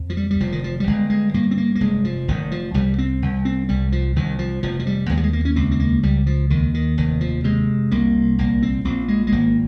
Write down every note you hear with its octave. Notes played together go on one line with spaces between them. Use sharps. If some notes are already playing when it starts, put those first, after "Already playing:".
Already playing: F2
F3
G3
G3
F1 F3
D#3
F3
G3
G1 G#3
G#3
G2 A#3
C4
A#3
A#3
F1 G#3
F3
F1 D#3
F3
C2 G3
C4
C2
C4
C2 G3
F3
C2 D#3
F3
F1 F3
F3
G3
D#2 G#3
G3
G#3
A#3
C#4
C#2 C4
C4
A#3
C#2 G3
F3
D#2 D#3
D#3
F1 D#3
F3
C3 G#3
C2 A#3
A#1 A#3
C4
A#1 C4
G#3
G#3
G#1 A#3